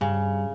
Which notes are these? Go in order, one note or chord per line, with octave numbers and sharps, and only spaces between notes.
G2 C#3